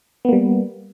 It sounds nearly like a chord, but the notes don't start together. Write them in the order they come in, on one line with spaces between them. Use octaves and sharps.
B3 A#3 G3